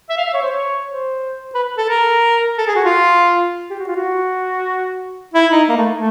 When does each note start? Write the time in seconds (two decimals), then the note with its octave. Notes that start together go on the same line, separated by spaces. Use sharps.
0.10 E5
0.17 F5
0.25 E5
0.34 C#5
0.42 C5
0.52 C#5
0.86 C5
1.54 B4
1.78 A4
1.89 A#4
2.58 A4
2.67 G#4
2.76 F#4
2.84 F4
3.70 G4
3.79 F#4
3.87 F4
3.96 F#4
5.34 E4
5.51 D#4
5.69 A#3
5.77 A3
5.92 A3